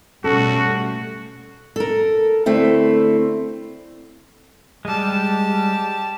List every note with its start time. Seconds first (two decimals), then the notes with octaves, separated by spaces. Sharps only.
0.24 B2 G3 A3 C#4 F#4 A4
1.76 A4 A#4
2.46 D3 A3 C4 E4
4.85 G3 G#3 G4 A5